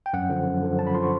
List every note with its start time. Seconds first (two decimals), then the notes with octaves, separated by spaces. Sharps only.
0.06 G5
0.13 F#2 F#5
0.29 D3 F3
0.47 F#2
0.63 D3 F3
0.79 F#2 A5
0.87 B5
0.94 D3 F3 C6
1.03 C#6